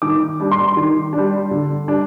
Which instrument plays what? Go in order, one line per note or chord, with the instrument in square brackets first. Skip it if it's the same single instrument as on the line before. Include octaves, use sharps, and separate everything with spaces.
[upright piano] D#3 D6
G3 D4
C6
D#3
G3 D4
D3
G3 D4